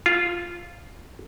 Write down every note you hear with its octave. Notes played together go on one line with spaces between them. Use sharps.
F4